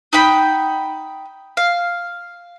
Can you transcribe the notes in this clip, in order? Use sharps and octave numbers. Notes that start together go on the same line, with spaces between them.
D#4 F#5 G5 B5
F5